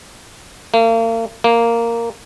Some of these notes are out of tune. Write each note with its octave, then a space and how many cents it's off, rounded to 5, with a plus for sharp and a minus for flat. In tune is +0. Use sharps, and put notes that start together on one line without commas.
A#3 -40
A#3 -5